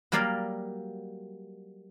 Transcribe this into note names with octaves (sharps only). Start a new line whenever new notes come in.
F#3 G3 A#3 D5 F5